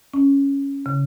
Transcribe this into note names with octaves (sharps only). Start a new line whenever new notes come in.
C#4
C#3